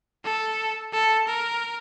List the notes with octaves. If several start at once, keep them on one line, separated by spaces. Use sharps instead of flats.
A4
A4
A#4